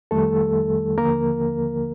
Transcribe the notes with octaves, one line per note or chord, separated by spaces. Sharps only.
F2 D#3 G3 A3 A4
D#2 D3 F3 A#3 A#4